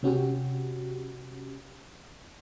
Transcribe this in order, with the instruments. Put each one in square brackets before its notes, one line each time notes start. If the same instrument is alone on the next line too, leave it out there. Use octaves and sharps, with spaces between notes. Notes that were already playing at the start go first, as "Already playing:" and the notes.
[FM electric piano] C3 C#4 F#4 G4